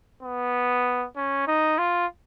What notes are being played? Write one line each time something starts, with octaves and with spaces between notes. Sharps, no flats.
B3
C#4
D#4
F4